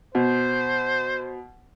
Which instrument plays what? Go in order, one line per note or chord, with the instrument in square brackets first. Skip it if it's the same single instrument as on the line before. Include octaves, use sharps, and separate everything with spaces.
[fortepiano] B2 [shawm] C5